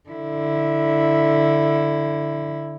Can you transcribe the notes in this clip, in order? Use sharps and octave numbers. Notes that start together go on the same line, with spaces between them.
D3 E4